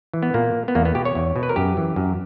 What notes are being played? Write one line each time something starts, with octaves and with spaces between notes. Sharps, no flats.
E3
B3
A#2 A#3
B3
E2 A#3
B3
B2 G4
C#5
E2
B2
B4
A#4
F#2 G4
E3
F#2